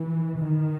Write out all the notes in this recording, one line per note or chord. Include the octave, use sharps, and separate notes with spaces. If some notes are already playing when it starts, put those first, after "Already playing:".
Already playing: E3
D#3